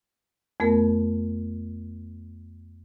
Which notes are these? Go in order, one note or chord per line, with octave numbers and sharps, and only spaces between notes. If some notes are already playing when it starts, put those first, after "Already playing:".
F2 A3 B3 A#4